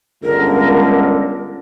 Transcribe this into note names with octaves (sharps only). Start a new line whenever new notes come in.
G1 C#2 D3 A#4